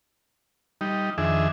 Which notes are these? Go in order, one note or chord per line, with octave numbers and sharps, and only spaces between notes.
G3 D#4
F2 D#3 D4 G#4 E5